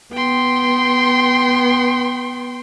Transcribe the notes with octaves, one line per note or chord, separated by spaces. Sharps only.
B3 G5 C6